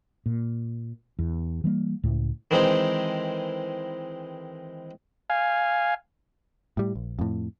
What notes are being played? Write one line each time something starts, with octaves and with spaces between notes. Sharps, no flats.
A#2
E2
E3 G3 A#3
C#2 A2
D#3 E3 G#3 C4 D#4
F5 G#5
A2 G3
A#1
F2 A2